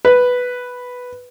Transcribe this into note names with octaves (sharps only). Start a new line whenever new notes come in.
B4